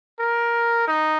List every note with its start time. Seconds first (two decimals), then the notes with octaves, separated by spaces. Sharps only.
0.19 A#4
0.88 D#4